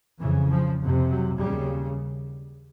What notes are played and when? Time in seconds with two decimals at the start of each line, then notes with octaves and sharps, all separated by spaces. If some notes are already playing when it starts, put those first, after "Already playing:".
0.20 F2 C#3 E3
0.51 F3
0.80 F2 C3
1.10 F#3
1.39 D#2 C#3 G3